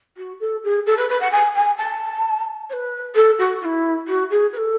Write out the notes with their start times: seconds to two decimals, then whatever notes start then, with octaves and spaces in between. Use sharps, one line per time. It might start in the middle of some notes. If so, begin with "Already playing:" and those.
0.17 F#4
0.40 A4
0.64 G#4
0.86 A4
0.97 B4
1.09 B4
1.20 F#5
1.32 G#5
1.55 G#5
1.78 A5
2.70 C#5
2.73 B4
3.15 A4
3.38 F#4
3.61 F#4
3.65 E4
4.07 F#4
4.31 G#4
4.53 B4
4.57 A4